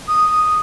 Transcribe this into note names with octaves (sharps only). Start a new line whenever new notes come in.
D#6